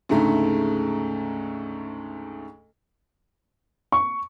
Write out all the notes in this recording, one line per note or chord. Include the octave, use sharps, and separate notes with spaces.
D2 G#2 C#3 A3 A#5
C#6